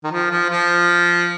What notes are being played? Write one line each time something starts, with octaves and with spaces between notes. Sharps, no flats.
D#3
F3
F3
F3